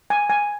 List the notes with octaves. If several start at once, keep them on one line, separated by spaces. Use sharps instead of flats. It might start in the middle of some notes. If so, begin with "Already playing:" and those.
G#5
G#5